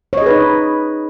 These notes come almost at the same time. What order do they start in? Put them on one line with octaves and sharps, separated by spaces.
C#5 D#5 G#4 B4 D#4